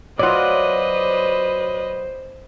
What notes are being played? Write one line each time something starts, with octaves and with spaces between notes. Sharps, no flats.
F#3 F4 B4 C5 D5 D#5 F#5